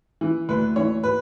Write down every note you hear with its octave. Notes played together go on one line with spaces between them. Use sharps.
E3
D2 B4
E3 C#5
B4